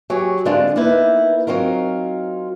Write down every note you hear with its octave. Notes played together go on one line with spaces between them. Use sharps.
F#3 G4 G#4 C#5
D3 G#3 C4 D4 F4
A#3 B3 D#4 E4 B4
F#3 C4 D#4 F4 A#4